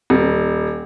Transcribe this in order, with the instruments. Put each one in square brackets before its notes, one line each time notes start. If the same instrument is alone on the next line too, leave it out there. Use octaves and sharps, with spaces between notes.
[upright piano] D#1